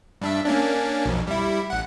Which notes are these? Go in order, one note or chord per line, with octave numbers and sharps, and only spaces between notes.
G2 D4 E5
A#3 C#4 D4
B1 F2
G3 E4
A1 F#5